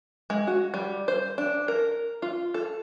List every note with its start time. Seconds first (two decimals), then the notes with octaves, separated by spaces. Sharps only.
0.30 G#3
0.47 F#4
0.74 G3
1.08 C5
1.38 D4
1.68 A#4
2.22 F4
2.54 A4